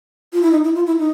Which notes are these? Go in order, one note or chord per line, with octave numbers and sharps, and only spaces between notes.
F4
E4
D#4
E4
F4
E4
D#4